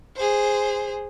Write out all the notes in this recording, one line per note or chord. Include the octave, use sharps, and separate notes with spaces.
G#4 C5